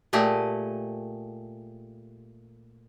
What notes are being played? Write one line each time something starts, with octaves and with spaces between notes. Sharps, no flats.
A#2 A3 G4 G#4 D#5